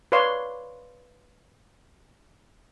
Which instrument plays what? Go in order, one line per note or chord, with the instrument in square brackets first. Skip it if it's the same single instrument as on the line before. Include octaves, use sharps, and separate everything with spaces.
[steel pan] B4 C#5 D5 F5 C6